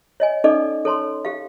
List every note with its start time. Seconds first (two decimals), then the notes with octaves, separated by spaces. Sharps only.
0.20 C#5 D#5 G#5
0.44 C#4 D#4 A4 D5 D#5 D6
0.85 A4 C#5 A5 C6
1.25 G4 F5